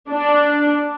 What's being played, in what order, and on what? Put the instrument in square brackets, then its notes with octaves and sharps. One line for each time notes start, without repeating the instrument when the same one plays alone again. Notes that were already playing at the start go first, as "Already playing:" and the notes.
[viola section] D4